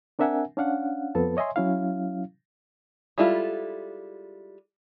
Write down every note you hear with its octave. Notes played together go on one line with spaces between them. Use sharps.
C4 D4 A#4 E5 F#5 G#5
C#4 D4 F5 F#5
F2 F3 B3 A4 B4 A5
C#5 D#5 E5 G#5 C6
F#3 C#4 E4 F5
G3 G#3 E4 F4 A4